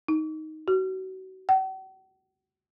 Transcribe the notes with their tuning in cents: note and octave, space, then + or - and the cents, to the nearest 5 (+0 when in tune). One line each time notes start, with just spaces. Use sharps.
D#4 +5
F#4 +30
F#5 +45